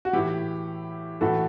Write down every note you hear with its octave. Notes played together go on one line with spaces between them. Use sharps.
F#4
A2 E3 E4 G4
A2 E3 F#4 A4